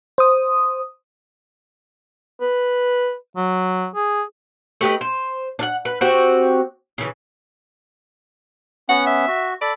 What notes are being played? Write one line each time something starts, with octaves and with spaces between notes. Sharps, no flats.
C5 D#6
B4
F#3
G#4
A3 G4 B4 D#5
C5
D4 F#5
B4
C4 F#4 G4
C#3 E3
B3 C#4 F#5
E5
F#4
A4 D5 B5